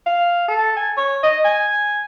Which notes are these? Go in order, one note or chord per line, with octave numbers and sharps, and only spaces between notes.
F5
A4
G#5
C#5
D#5
G#5